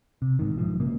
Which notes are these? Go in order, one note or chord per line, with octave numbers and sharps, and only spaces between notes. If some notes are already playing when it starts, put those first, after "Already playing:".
C3
A1 G#2 D#3
B1 G#2 F3
G#2 C#3 A#3